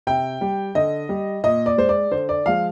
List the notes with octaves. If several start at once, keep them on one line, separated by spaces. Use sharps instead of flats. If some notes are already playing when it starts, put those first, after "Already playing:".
C3 G5
G3
D3 D#5
G3
A#2 D#5
D5
G#3 C5
D5
D3 C5
D5
F3 G#3 F5